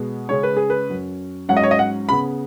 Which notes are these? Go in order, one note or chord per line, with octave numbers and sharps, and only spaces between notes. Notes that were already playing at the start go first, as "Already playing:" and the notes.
Already playing: B2 G#3 B3
C#3 G#3 C#4 C#5
B4
G#4
B4
F#2 F#3 C#4
G#2 F#3 C#4 F#5
D#5
C#5
D#5
F#5
C#3 B3 B5